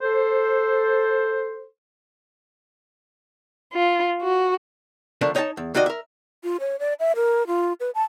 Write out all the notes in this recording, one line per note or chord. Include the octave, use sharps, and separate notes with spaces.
A4 C5
F4
F#4
D3 F3 A3 D4 A#4
D#4 C#5 D#5 G5 A5
E2
D#2 A#3 F#4 D5 D#5
A#4 E5
F4
C#5
D5
E5
A#4
F4
B4
A5